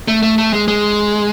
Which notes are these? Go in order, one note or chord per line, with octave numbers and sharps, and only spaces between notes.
A3
A3
A3
G#3
G#3